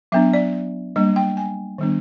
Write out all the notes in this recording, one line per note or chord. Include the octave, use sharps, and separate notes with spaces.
F#3 B3 D4 E5
D5
G3 A#3 D4 D#5
G5
G#5
D#3 G3 B3 D4